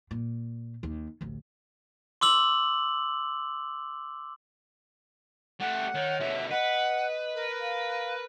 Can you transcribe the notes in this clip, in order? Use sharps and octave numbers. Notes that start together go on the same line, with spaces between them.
A#2
D#2
A1 D2
C6 D6 E6 F#7
A3 G4 F#5
D#3 C#5
B2 D3 E5
B4 D#5 F#5
A#4
F5